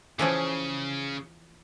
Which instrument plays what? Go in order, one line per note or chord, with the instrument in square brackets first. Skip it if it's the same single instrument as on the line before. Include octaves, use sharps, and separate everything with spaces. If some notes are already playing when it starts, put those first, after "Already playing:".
[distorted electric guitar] C#3 [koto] E3 F3 C#4